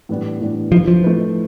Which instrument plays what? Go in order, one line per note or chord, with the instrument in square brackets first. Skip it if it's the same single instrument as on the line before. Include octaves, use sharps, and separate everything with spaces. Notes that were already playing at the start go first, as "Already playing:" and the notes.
[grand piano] A2 E3 G3 B3 D4
A2 E3 G3 B3 D4
[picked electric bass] F3 [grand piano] A3 E4 B4
[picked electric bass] F3
[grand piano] A3 E4 B4